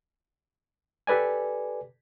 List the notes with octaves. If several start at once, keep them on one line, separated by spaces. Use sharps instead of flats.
G4 A4 B4 D5 G#5